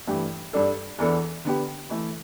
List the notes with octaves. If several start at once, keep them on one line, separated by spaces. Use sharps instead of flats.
G2 E3 A3 G4
G2 G3 D4 A4
E2 E3 B3 D4 A4
D3 B3 G4
E3 A3 E4